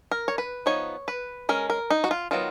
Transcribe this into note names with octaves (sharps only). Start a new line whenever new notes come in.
A#4
C#5
B4
F3 B3 D#4 C#5
B4
G#3 C#4 A#4
A#4
D#4
F#4
F4
D#3 F#3 B3 F4